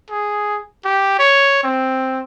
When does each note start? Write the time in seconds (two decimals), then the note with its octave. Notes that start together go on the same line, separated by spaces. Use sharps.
0.10 G#4
0.85 G4
1.19 C#5
1.64 C4